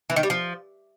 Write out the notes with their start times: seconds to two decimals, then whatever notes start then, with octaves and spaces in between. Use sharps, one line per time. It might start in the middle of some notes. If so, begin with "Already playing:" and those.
0.10 E3
0.16 D#3
0.23 G3
0.30 F3